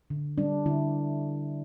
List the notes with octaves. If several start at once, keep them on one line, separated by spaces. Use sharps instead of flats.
D3
G3 D4
D3 E4